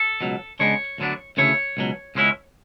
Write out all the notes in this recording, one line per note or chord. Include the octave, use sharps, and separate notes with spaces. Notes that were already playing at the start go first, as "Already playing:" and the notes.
Already playing: A4
C#2 B2 F#3
C#3 G#3 B3 D4 C#5
D2 D3 F#3 B3 D4
D2 C#3 E3 A3 E4 C#5
C#2 B2 F#3
C#2 B2 G#3 C#4 E4